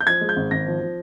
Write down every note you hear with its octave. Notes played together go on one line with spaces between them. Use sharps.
G6
F3 G#6
G#3
G6
G#1
G#1 A#6
F3
F3